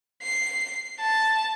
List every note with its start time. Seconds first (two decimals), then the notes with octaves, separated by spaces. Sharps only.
0.22 C7
1.00 A5